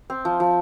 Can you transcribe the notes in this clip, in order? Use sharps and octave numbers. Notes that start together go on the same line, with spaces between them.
C4
F3
F3